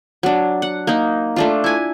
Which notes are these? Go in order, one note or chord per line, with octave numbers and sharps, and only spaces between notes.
F#3 D4
F#5
A#3 D#4
A3 D4 F4
E4 G#5